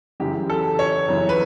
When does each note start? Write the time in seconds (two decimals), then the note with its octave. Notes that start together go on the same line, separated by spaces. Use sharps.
0.20 F#2 C#3 E3 G4
0.50 A4
0.79 C#5
1.08 F#2 C#3 E3
1.29 B4